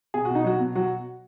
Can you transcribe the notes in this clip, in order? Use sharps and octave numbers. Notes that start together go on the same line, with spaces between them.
B2 G#4
B2 F#4
D#4
F#3 F#4
B2
F#3 F#4